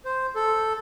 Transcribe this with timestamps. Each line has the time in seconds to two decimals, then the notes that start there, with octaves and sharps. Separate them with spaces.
0.05 C5
0.35 A4